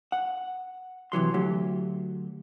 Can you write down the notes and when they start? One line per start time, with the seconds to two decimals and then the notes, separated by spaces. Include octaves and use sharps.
0.12 F#5
1.12 C3 E3 F#3 C6
1.34 D2 F#3 G4